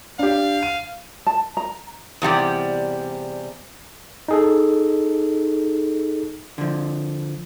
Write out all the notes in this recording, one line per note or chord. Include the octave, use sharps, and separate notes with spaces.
D4 G4 F5
D#7
A5
A#5
E2 C3 G3 D5
D#4 G#4 A4
D3 F3